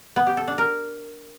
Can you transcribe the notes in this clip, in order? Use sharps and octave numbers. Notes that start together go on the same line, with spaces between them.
B3
G4
A4
D4
A#4